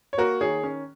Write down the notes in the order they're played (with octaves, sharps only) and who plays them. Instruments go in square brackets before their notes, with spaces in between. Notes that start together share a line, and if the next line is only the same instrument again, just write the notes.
[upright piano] C#5
A#3 F#4 A#4
D#3 G#4 C#5
C#4